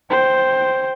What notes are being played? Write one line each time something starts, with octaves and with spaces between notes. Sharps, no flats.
C5 G5